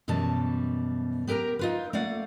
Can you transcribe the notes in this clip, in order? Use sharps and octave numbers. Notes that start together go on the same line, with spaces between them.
F#2 B2 E3 G3 A5
B3 G4 A#4 G5 A#5
D#4 F4 B4
A3 A#3 D5 F5 F#5